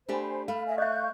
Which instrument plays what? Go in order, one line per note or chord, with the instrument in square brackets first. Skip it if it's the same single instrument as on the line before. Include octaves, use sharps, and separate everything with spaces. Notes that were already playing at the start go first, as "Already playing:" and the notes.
[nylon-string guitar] A3 D4 G4 [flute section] C5 G#5 B5
[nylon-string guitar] A3 [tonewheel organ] F5 [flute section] B5
[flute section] D#5 E5 G#5
[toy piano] D#5 E5 [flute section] C#6 F#6 G6